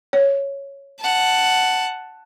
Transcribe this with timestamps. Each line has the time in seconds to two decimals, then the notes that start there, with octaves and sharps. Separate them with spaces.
0.13 C#5
1.00 F#5 A5